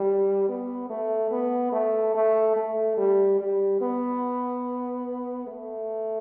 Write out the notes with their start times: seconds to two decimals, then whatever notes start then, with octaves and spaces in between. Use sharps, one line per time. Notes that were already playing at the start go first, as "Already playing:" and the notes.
Already playing: G3
0.49 B3
0.89 A3
1.31 B3
1.72 A3
2.15 A3
2.56 A3
2.97 G3
3.39 G3
3.81 B3
5.47 A3